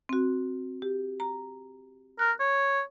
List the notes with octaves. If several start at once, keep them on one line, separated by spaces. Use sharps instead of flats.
C4 F#4
G4
A#5
A#4 F#6
C#5